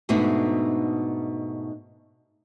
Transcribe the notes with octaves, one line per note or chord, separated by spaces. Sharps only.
G#2 B2 A3 B3 D4 D#4